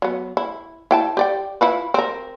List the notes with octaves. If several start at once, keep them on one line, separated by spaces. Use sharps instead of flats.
F#3 B3
E4
E4 G5 A5
G4 D5 G5
E4 F4 B4
C4 A#4